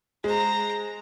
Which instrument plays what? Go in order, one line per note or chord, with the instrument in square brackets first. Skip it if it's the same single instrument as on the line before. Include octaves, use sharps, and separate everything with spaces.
[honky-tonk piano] G#3 [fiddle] C5 A#5